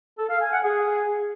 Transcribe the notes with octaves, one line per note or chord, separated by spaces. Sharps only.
A4
F5
G#5
F#5
G#4